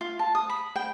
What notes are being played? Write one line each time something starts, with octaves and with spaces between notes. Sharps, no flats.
F4
A5
D#6
B5
G5